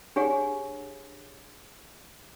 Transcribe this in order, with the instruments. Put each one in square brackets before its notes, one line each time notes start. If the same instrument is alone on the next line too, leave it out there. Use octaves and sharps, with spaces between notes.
[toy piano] D4 G4 G#4 C#5 F#5